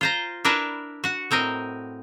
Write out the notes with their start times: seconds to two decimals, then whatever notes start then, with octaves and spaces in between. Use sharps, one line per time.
0.01 F4 C5 A#5
0.45 D4 E4 A#4 B4
1.04 F#4 F#5
1.31 A2 C4 A#4 D#5